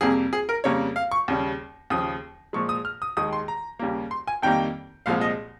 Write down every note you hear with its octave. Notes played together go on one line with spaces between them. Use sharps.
F2 C3 G3 A#3 G#4
G#4
A#4
F2 C#3 G3 A#3 C#5
F5
C#6
D#2 C#3 G3
D#2 C#3 F3 D#6
A#2 F3 G#3 C#6
D#6
F6
D#6
D#2 D#3 G#3 D#6
C6
A#5
D#2 C#3 G3 A#3
C6
G#5
F2 D#3 G3 A#3 G5
C2 A#2 F3 G#3 F5
D#5